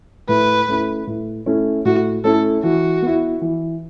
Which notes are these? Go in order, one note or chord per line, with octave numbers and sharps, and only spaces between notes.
A2 B4
A3 C#4 E4
A2
A3 C#4 E4
A2 F#4
A3 C#4 E4 A4
E3 F#4
B3 E4
E3